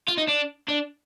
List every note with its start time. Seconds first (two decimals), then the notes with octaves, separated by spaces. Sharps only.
0.08 F4
0.17 D#4
0.28 D4
0.68 D4